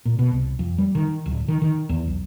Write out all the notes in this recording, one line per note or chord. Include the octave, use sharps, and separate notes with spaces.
A#2
B2
C2
F2
G3
D#3
D1
D#3
D#3
E2
B1